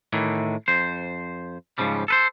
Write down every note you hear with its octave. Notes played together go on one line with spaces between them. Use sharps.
A2 D#3 E3
F2 C5
G#2 C#3 F3 G3
A4 B4 C5